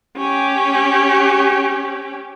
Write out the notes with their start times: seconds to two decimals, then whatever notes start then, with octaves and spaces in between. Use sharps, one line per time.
0.17 C#4 G4